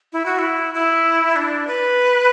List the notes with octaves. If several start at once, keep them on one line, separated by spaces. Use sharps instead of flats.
E4
F#4
E4
E4
D4
B4